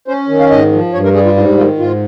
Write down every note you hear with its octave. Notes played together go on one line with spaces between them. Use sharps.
C#4 C5
D#3
F5
G#2 D#5
F3
G2 C#5
A#4
G3 G#4
F4
G#2 F4
D#3 F4
G#2 F4